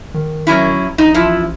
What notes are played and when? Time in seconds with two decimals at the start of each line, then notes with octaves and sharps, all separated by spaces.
0.14 D#3
0.47 F#3 C#4 E4
0.98 A1 D#4
1.14 F3 E4